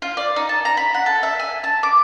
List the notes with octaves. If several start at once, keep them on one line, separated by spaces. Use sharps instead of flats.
F4
D5
D#4
A5
A#5
B5
F#5
A4
E5
G#5
A5
D6